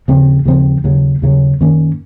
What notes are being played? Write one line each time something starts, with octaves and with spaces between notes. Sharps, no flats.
D#2 C#3 F3 C4
D#2 C#3 F3 C4
D#2 C#3 F#3
D#2 C#3 F#3
F#2 D#3 A#3 C#4